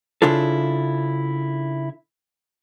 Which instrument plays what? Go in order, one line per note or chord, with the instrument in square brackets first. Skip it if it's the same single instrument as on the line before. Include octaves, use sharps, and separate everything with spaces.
[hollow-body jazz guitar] C#3 D4 E4 F4 A4